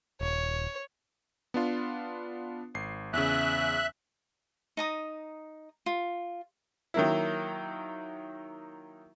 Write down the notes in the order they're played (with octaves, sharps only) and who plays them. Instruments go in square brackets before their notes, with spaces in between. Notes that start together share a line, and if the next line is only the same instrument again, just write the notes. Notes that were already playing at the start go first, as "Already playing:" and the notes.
[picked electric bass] D#1 [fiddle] C#5
[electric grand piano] B3 D4 F4
G#1 C7
[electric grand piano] E2 C#3 [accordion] E5 F#6
[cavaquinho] D#4 A#5 D#6
F4
[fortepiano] D#3 F#3 A#3 E4